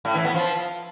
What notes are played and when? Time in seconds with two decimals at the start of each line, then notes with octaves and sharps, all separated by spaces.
0.05 A2
0.15 E3
0.25 B3
0.34 F3